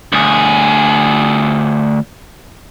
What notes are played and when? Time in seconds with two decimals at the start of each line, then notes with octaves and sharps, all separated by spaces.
0.12 D2 G#4